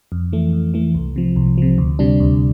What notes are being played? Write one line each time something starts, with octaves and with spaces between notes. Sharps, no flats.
F2
E3 A3
F2
E3 A3
C2
C3 F3
C2
C3 F3
D2
C3 G3 D4
D2